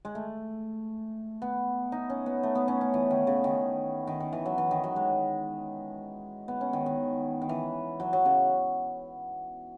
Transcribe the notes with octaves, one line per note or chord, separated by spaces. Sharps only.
G#3
A3
B3
D#4
C#4
B3
A3
B3
C#4
C#4
E3
D#3
C#3
D#3
D#3
D#3
E3
F#3
E3
D#3
F#3
G#3
B3
C#4
D#3
D#3
D#3
E3
F#3
F#3
C#3